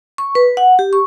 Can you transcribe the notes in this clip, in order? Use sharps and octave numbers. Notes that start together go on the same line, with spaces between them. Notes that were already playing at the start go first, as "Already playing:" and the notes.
C#6
B4
F#5
G4
C#6